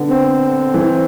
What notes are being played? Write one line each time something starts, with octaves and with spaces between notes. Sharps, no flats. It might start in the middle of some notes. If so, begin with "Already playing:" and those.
Already playing: D3 B3
C4
E3